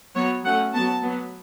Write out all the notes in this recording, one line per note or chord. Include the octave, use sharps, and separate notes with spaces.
F#3 B3 C#5
F#3 A3 C#4 F#5
F#3 B3 A5
F#3 B3